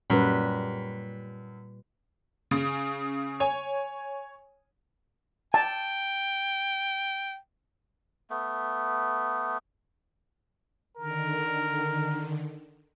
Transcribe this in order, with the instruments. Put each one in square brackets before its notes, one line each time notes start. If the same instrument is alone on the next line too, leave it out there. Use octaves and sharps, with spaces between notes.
[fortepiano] F#2 [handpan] A#2 G3 B4
[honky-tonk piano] C#3
C#5 G#5
[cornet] G5 [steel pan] A5
[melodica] A3 B3
[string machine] D3 D#3 [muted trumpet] A#4